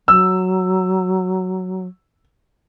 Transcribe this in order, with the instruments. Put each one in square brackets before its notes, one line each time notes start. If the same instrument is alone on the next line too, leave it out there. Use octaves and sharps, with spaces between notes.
[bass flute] F#3 [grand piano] E6